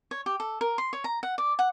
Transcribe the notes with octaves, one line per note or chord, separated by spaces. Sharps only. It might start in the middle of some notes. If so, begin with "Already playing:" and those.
C#5
G4
A4
A#4
C6
C#5
A#5
F#5
D5
F#5